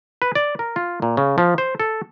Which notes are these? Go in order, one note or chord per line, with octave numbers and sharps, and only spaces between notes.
B4
D5
A#4
F4
A#2
C#3
F3
C5
A4